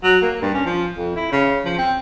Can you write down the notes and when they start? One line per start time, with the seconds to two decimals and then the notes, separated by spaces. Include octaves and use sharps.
0.03 F#3
0.22 A#3
0.42 G2
0.54 C#4
0.66 F3
0.97 F2
1.16 E4
1.32 C#3
1.65 F3
1.78 C4